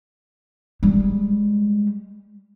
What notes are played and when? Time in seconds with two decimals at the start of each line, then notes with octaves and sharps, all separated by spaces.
0.83 G3 G#3